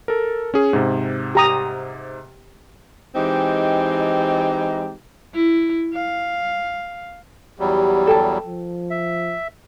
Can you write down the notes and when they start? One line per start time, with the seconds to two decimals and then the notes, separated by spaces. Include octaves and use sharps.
0.08 A4 A#4
0.54 C#4 G#4
0.73 G#2 C3
1.35 G4 A#5 D#6
3.16 E3 G#3 C4 D#4 G4
5.34 E4
5.93 F5
7.60 E2 F#3 G3 G4
8.07 A4 G5 A5
8.46 F3
8.91 E5